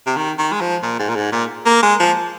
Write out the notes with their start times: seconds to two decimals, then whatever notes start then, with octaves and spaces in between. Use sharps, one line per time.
0.07 C3
0.16 D#3
0.39 D#3
0.52 G#3
0.61 F3
0.83 A#2
0.99 G#2
1.09 A#2
1.16 G#2
1.32 A#2
1.66 A#3
1.83 G#3
2.00 F3